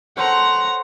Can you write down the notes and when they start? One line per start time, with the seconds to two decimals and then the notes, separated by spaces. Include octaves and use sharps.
0.17 A4 C5 C#5 F#5 A#5